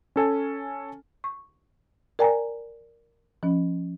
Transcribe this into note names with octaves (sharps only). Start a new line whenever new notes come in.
C#4 A4 G#5
C#6
A#4 D5 G5 G#5 A#5
F3 C#4